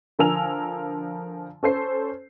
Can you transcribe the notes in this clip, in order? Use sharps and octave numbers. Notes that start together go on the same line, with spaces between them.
D3 F3 A#4 G#5 E6 F7
C#4 A4 C5 C7